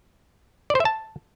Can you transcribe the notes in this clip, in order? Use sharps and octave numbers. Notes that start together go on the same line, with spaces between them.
D5
C5
E5
A5